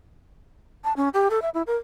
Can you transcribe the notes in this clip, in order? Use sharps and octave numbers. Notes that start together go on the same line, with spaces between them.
A5
C#4
G4
A4
E5
E4
A#4